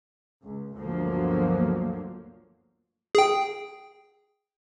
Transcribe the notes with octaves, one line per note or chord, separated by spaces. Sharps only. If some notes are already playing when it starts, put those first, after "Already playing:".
C#2
G1 D2 D3 F3 F#3 A#3
G#4 G5